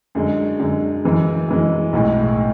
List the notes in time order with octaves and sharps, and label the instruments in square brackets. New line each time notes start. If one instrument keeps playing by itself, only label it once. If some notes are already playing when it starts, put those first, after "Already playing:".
[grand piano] F#2 D3 G#3
F#2 D3 G#3
F#2 E3 G#3
F#2 E3 G#3
B1 A2 G#3